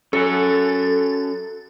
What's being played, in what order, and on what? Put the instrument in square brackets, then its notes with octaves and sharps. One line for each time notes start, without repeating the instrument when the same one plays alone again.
[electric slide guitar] C#4 F#4 G#5 [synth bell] A4